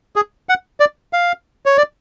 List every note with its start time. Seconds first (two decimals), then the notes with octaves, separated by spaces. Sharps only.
0.16 G#4
0.49 F#5
0.80 D5
1.13 F5
1.66 C#5
1.78 D5